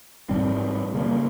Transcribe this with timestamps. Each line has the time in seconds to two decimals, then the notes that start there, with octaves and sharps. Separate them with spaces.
0.29 G#2 G3 C4
0.94 C#3 G3 A#3